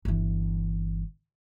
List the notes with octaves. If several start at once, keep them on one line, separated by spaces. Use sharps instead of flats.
G1 E3